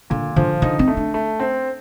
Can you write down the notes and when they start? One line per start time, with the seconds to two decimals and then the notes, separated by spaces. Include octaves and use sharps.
0.10 A#2 D3
0.36 D3 F3
0.62 D3 D#4
0.79 C4
0.88 A3
0.97 D4
1.14 A3
1.40 C4